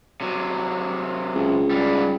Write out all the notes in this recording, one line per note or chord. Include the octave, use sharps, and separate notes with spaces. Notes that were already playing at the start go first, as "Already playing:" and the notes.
C3 F#3
C#2
G#2 G3